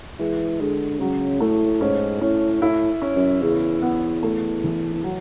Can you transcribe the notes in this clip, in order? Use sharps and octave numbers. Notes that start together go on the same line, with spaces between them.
E3 G#3
D3 G#3
C#3 F#3
A2 A3
G#2 C#4
A2 C#4
A2 E4
C#4
F#2
E2 C#3
B3
A3
E3
E2
F#3